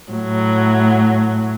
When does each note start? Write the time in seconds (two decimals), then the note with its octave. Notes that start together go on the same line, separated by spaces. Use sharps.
0.12 A2 F#3